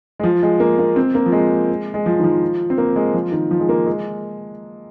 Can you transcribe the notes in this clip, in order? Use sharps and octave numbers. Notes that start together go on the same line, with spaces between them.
G#3
F3
G#3
A#3
A#3
C4
A#3
F3
G#3
G#3
F3
D#3
F3
C4
A#3
G#3
F3
D#3
F3
G#3
A#3
G#3